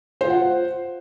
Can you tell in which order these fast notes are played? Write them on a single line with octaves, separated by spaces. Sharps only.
C5 F4 F#5